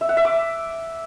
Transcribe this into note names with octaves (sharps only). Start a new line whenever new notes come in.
E5
F#5
E5
D6